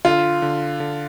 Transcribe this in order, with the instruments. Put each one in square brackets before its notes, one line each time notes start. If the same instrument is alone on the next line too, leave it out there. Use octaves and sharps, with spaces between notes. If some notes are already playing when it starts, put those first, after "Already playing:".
[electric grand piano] D3 [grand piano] F4
[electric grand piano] D3
D3